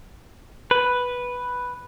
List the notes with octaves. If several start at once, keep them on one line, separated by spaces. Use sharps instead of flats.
B4